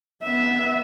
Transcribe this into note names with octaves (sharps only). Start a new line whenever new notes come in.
B3 E5